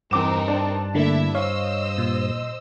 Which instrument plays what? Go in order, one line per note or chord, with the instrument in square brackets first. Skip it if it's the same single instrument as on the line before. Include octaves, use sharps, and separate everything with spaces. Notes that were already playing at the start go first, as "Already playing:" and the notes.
[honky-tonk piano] E2 D6 E7 [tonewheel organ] G2 [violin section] C4 D#4 A#4
[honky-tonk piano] D4 D5 A5
[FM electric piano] D3 A3 A#3 [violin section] E4 E5
[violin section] C5 D#5 E6 [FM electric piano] C#5 [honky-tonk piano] F5
[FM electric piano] A#2